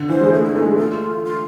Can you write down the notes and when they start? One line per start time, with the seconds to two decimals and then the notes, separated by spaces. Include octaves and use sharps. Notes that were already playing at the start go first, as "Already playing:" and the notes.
Already playing: D3
0.09 E3 C5
0.21 G#3
0.32 A3 G#4
0.44 E4
0.55 A3 D#4
0.66 G#3
0.76 A3 F4
1.25 F4